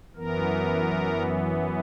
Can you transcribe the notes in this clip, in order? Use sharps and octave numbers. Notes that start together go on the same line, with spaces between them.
F#2 E3 B3 A#4